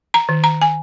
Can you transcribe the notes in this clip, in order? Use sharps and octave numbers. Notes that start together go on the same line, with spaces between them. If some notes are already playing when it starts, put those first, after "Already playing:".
A#5
D#3
A#5
G#5